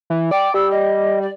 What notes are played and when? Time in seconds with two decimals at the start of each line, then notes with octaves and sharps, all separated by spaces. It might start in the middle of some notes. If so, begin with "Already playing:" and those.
0.10 E3
0.31 D5 G5
0.54 G3 E6
0.71 D#5
1.22 D5